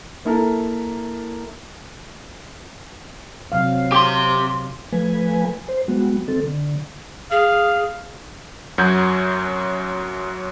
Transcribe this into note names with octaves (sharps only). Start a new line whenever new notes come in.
A#3 E4 A4 A#4
C3 F#3 F5
G4 C6
F3 A3 B4 G#5
C5
G3 G#3 B3 F#4
D#3 C4 A4
D3
G#4 F5
F#2 F#3 F#4 G6 G#6